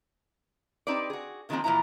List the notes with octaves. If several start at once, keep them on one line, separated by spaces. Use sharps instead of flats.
C4 D#4 G4 B4 D5
F#4 G#4
C3 D#3 F3 G#3 A#3 C4
A#2 E3 F3 E4 A#5